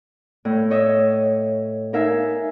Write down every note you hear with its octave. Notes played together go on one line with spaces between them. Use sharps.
A2
C#5 D#5 E5
D#4 A#4 E5 F5 G#5